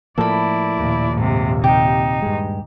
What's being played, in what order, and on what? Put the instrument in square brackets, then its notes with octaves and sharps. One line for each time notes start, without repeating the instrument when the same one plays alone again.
[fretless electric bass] A2 F3 A#3 [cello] E4 D5 [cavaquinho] A4 B5
[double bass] D#2 A#2
[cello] G#2 C3
[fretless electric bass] C3 [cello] D#4 [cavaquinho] G4
[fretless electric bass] G2 G#3